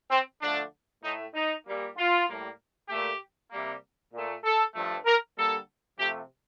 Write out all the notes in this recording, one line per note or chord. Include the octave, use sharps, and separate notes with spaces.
C4
D3 F3 A3 D4
A2 A3 D#4
D#4
A#2 G3 A#3
F4
A2 G3 A#3
A#2 A3 G4
C3 G3 A#3
A#2 A3
A4
G2 F3 A3
A#4
D3 G3 A#3 A4
C3 F3 A3 G4